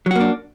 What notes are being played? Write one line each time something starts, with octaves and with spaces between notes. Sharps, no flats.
F#3 A#3 D4 F#4